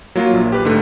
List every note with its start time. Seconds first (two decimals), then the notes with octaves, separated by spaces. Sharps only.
0.15 F#3 A#3 F4
0.33 A#1
0.52 G4 B4
0.65 G#2 D3 A3